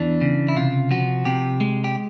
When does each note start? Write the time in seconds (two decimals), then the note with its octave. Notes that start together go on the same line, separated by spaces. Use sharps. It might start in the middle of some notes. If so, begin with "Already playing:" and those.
Already playing: E2 E3 D4
0.21 C#3
0.48 E4
0.56 C3 F4
0.91 F3 F#4
1.25 C3 G4
1.61 G#3
1.84 G4